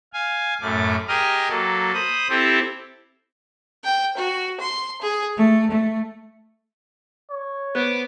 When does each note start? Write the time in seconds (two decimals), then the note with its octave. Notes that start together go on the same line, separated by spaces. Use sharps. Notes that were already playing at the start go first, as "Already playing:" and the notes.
0.13 F5 G#5
0.61 F#2 A2 A3 D6
1.08 G4 G#4 A#4 D#5 D#6 F6
1.49 F#3 A#3 A4
1.94 C5 B5 D#6
2.29 C4 E4 G4 A4 C5
3.84 G5
4.16 F#4
4.61 C6
5.01 G#4
5.37 A3
5.70 A3
7.30 C#5
7.75 B3 C5 D6